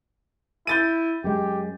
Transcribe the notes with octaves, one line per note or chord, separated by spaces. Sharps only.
E4 G6 A6 D#7
F#2 G#3 G4